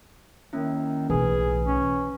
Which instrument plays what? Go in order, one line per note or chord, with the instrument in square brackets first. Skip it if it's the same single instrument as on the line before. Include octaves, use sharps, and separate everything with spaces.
[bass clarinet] D#3 [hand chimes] A#3 C#4 E4
[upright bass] B1 A2 [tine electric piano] E3 [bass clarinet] G#4 [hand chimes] B4 G#5
[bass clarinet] C#4